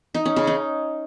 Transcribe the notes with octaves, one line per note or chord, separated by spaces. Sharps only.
D#4
C#4
C#3
D#4